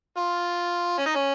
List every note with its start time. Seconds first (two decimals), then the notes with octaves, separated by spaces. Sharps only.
0.17 F4
0.98 C#4
1.06 D#4
1.15 C#4